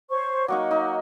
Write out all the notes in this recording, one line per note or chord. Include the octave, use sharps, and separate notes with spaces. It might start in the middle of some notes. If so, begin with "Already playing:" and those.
C5 C#5 C#6
F#3 A#3 D#4 F#5 C#6 D6
D#4